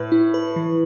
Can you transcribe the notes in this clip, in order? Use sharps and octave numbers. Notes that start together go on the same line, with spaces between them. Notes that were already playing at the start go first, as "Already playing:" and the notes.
Already playing: A2 B4
E4
B4
E3